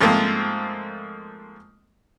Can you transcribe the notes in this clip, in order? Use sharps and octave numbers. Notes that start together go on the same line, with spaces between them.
G#2 F3 A3 A#3 C4